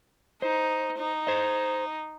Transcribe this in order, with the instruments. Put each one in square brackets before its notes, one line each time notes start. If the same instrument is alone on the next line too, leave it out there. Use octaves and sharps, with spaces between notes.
[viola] D#4 [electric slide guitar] C5
[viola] D#4
[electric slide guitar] C5 D#5